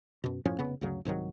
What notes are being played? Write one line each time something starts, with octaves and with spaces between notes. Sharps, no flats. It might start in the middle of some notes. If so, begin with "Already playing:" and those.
F#2 B2
F#2 A2 F3 C#4
F1 C#3 B3
D2 G2 C#3 F#3
C2 G#2 D#3 F#3